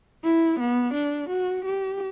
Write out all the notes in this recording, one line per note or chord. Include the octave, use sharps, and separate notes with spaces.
E4
B3
D4
F#4
G4